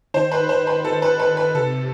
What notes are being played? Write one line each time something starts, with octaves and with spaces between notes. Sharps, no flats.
D#3 C5
B4
C5
B4
A4
B4
B4
B4
C3 A4